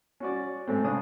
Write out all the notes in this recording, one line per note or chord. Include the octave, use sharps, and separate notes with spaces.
C#4 F#4 D5
G#2 A3 C4
C#3 G#3 D4 D#6